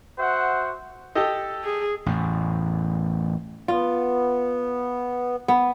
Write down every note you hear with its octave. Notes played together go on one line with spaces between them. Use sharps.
F#4 C5 E5 F#5
G4 A4 D#5
G#4
A1 E2 A2
B3 F4
B3